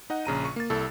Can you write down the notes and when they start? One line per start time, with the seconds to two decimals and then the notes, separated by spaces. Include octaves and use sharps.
0.10 D#4 D#5 F#5
0.25 A#1 C#3 A#5 D#7
0.45 C#6
0.56 A#3 A6
0.70 C2 E4 A4